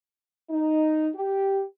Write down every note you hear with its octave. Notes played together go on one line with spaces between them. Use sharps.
D#4
G4